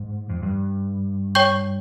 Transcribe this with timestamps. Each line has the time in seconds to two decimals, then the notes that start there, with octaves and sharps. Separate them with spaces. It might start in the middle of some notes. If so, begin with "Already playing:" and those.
Already playing: G#2
0.30 F2
0.43 G2
1.35 C#5 G5 C#6 G6